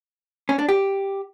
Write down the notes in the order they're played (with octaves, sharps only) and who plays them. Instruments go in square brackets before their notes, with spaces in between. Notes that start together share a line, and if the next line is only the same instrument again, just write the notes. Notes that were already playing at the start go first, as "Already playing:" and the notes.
[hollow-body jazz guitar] C#4
D4
G4